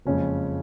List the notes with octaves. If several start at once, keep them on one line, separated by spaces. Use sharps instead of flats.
F#1 F2 C#3 G#3 C#4